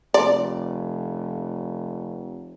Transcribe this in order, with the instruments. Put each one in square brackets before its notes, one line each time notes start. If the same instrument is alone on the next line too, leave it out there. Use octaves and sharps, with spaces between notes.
[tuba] F1 [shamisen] D5